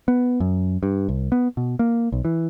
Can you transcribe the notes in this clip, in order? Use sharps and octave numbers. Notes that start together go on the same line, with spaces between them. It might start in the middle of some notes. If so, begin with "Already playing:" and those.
B3
F#2
G2
C2
B3
B2
A#3
B1
E3